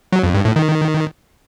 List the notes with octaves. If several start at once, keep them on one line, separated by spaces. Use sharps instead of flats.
F#3
F2
G2
A2
D#3